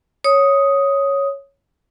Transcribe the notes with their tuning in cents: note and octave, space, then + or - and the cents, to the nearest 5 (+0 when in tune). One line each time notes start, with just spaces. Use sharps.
C#5 +0 D#6 +5